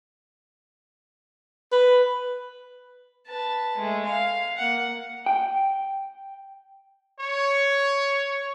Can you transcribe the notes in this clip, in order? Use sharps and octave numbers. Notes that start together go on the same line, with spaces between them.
B4
B4 A5
G#3 A3
F5
A#3 F#5
G5
C#5